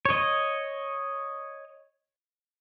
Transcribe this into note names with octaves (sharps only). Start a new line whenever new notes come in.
C#5 D#5